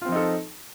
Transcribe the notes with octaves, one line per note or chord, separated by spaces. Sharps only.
F3 C4 D#4 F4 A4